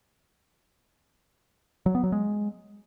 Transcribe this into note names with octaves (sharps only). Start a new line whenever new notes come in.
F#3
B3
F#3
G#3